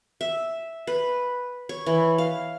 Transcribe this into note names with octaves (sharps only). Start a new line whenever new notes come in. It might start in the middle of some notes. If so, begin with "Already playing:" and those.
E5
B4
C#5
E3
F5